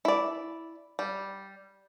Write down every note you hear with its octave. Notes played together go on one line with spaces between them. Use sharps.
E4 D5
G3